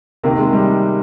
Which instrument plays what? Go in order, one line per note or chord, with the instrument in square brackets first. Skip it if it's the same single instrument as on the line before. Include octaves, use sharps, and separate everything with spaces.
[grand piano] C3 D#3 A#3
G#3
G3